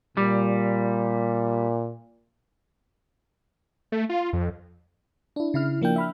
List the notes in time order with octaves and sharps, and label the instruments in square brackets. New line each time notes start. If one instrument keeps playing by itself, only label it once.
[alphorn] A#2 [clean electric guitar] G3
[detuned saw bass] A3
F4
F2
[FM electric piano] D4 E4
C#3 E4 F6
F3 A#3 D4 G5
E5 B5 F6